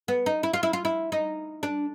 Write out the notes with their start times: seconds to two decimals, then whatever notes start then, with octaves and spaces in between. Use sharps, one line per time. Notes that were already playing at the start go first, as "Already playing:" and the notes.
0.08 B3
0.26 D#4
0.43 E4
0.53 F4
0.63 E4
0.73 F4
0.85 E4
1.12 D#4
1.63 D4